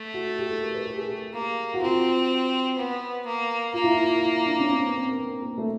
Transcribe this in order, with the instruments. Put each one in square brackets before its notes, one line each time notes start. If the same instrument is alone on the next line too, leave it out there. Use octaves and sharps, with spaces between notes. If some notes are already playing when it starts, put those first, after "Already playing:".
Already playing: [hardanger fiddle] A3
[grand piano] F#4
G4
A4
A#4
B4
G4
G#4
G4
[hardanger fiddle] A#3
[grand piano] F#4
[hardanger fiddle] C4 [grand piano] F4
[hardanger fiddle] B3
A#3
[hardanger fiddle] A#3 [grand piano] F4
[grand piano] E4
F4
E4
D4
C#4
C4
B3
C4
A#3
B3
A#3
A3